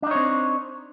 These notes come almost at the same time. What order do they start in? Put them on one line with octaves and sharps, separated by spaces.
D4 D#4 C#5 C4